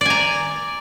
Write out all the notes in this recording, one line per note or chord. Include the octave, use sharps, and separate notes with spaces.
D5 G#5 A#5